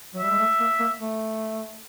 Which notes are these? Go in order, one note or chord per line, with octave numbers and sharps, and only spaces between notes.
F#3
G3 E5
G#3
A3
A#3
A#3
A3